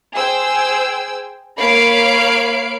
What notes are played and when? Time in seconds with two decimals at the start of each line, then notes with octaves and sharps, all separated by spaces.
0.15 G#4 C5 G5 E6
1.58 A#3 C#5 F5 B5 C7 D7